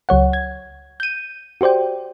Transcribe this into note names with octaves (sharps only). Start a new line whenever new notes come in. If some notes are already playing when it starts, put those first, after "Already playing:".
C#2 F#3 C#5 F#5
G#6
G6 D#7
F#4 G4 C5 D5 G5